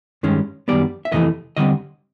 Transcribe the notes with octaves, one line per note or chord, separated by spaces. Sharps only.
G2 D#3 G#3 C#4
F#2 D#3 G3 B3 D5
E5
F2 C3 E3 A3 D#5
D3 G3 C4 D#5